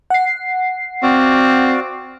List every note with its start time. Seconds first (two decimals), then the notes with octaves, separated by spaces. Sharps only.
0.10 F#5 C7
1.03 C4 F#4 D5 F5